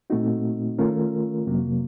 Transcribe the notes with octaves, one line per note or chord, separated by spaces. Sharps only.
A#2 A3 C4 D#4 F#4
D#3 A3 C#4 F4 A#4
F2 C3 F#3 A#3